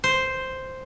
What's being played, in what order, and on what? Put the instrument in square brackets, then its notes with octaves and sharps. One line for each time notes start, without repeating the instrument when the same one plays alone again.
[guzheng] C5